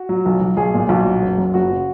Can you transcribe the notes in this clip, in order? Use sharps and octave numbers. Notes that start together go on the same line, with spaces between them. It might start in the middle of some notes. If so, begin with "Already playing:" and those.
Already playing: F#4
F#3
B1
B1
B1 G#4
A#2
B1 F#4
F#3
F#1
F#2
F#1 F#4
C#3